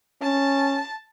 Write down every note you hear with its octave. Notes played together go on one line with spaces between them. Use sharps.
C#4 A5